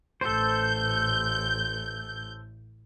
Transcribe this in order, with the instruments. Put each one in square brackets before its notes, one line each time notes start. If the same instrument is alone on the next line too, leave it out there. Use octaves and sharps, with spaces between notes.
[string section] A1 G6 [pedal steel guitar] A4 C5